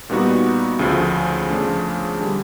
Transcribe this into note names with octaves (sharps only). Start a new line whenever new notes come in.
A#2 G3 B3 D#4 F#4
D2 C#3 F3 A3
C#3 F3 A3 D4
D3 G3